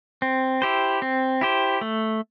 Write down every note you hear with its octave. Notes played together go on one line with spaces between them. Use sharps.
C4
E4 G4 C5
C4
E4 G4 C5
A3